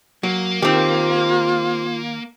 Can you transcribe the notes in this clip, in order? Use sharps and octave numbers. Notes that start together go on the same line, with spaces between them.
F#3 A#3
D#3 C4 F4 G4